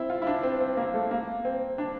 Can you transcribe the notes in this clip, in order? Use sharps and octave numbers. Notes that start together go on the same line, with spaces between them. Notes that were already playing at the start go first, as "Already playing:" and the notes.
Already playing: C4 E4
F4
E4
D4
C4
C4
A#3
A3
A#3
C4
D4